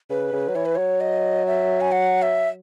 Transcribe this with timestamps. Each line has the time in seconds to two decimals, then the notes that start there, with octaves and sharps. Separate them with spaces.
0.10 C#3 B4
0.33 C#3
0.48 F#3
0.55 E3 C#5
0.65 B4
0.75 F#3 C#5
1.00 D#5
1.46 E5
1.81 G#5
1.92 F#5
2.22 E5